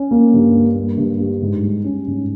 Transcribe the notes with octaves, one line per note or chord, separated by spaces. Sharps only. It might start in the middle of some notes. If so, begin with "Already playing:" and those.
Already playing: C#4
A#3
G2
G3
A#3
G2
G3
G#2
G3
C#4
G#2